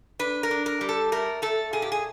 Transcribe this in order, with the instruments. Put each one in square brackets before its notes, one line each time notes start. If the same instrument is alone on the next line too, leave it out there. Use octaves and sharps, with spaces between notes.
[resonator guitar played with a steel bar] D4 B4
A#4
D4
A#4
G3
A4
A3 A#4
A3 A4
A#2 G#4
G4
G#4